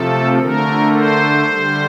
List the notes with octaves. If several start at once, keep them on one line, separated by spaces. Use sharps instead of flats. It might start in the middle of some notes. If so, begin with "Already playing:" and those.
Already playing: C3 F3 A3 A4
D3 A3 A#4
C5
D3 G3